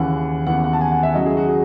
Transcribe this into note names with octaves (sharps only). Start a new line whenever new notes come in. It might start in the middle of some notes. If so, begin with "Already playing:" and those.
Already playing: D#2 C#3 E3 F#5
D#2 C#3 E3 B3 F#5
F#5
A5
G#5
F#5
E5
C#3 F#3 C#4 E4 D#5
G#4
F#4
G#4